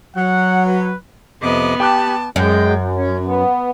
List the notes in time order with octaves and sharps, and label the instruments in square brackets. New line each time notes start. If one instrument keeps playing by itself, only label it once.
[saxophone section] F#3 [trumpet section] F#5
[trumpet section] B4
[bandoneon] F2 C3 D6 [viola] B3 [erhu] D#5
[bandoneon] G4 [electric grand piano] G5 D6 F#6 [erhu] A5
[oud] F#2 [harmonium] G#3 G5
[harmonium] C#4
B3